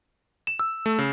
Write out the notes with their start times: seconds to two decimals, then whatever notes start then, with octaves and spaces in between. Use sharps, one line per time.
0.47 E7
0.59 E6
0.86 A3
0.99 C#3